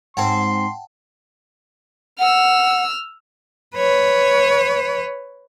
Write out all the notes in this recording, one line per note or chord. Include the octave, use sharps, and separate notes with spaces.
G#2 C4 F#5 G5 A5 C6
F#5 E6 F6
B4 C#5